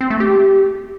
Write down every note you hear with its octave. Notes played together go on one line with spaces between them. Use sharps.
C4
A3
G4